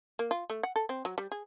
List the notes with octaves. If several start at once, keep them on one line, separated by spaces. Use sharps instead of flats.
A#3
F4
A3
F#5
A4
C4
F#3
G3
G#4